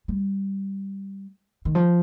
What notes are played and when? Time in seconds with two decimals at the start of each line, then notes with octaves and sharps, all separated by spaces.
0.08 G3
1.65 D#3
1.75 F3